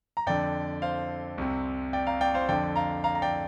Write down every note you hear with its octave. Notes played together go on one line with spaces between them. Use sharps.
A#5
F2 D3 D5 G5
C5 F5
C2 C3
D5 G5
F5 A#5
D5 G5
C5 F5
F2 D3 D5 G5
F5 A#5
F5 A#5
A#5
D5 G5